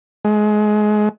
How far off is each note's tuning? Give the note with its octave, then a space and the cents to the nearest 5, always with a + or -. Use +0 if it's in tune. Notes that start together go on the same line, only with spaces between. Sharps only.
G#3 +25